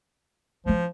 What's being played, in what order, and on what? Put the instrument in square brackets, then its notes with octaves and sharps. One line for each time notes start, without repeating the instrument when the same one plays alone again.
[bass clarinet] F3 [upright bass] C4 E4